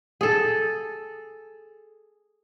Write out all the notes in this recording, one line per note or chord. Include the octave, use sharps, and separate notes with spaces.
G#4 A4